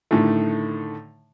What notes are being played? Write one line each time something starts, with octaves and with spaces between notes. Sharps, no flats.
A2 D3 D#3 A3